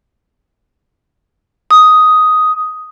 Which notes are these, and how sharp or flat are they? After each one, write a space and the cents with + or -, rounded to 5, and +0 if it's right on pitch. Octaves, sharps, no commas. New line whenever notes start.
D#6 +5